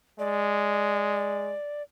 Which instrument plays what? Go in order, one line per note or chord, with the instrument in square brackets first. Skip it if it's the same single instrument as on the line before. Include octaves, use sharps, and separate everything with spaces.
[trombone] G#3 [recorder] D5